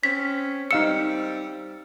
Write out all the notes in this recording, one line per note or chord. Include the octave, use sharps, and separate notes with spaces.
C4 C#4 B6
G3 C4 D#4 F5 E6 C#7